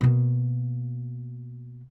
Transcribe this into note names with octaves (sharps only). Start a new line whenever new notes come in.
B2 A#3